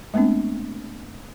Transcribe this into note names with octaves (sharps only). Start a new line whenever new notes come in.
G#3 A3 B3 C4 D4